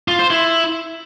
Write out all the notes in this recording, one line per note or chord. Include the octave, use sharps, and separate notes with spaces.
F4
C5
E4